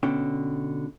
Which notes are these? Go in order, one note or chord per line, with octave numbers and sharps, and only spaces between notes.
B2 D3 C#4 G5